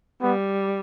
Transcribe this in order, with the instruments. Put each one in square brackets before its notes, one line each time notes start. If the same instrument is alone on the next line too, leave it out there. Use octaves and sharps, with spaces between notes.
[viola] G3 [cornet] B3